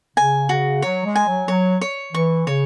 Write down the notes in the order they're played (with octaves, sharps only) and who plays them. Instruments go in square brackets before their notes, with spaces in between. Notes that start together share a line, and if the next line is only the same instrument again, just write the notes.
[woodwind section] C#3 [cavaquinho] G#5
[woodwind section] C#3 [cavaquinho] F#4
[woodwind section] F#3 [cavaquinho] C#5
[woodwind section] G#3
[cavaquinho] G#5
[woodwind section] F#3
[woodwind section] F#3 [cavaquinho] C#5
[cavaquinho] C#5
[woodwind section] E3 [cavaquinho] C#6
[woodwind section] C#3 [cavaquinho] C#5